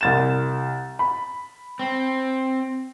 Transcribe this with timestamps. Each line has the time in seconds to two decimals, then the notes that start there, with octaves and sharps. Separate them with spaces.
0.01 C2 A6 E7
0.99 B5
1.79 C4